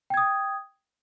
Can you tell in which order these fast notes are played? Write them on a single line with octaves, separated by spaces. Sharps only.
G5 G#6 D#6